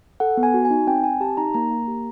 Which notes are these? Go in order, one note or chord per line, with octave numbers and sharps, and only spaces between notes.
A4 F#5
B3
G#5
F#4
G#5
D#4
C4 G5
C4 G#5
G4 A5
D#4 A#5
A#3 A#5
A#3
G4